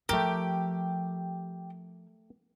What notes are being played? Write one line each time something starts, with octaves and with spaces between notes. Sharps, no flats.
F3 A3 G4 A#4